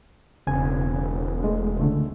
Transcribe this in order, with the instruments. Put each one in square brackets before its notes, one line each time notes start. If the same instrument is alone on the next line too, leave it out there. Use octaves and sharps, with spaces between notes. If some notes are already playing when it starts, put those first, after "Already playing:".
[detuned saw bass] E1 [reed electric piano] C#3 C4 G#5
[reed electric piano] G#3 A3
C#2 D3 A3